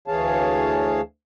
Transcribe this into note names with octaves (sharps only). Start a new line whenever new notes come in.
D2 E3 G#4 C#5 F5 A5